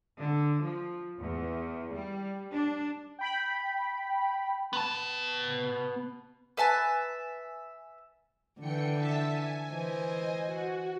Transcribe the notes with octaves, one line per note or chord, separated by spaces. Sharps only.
D3
F3
E2
G3
D4
G5 B5
B3 A5
B4 E5 G#5 A5
D3 E3 G5 C#7
E5 A5 B6
G#5
E3 C5 D#5
F#4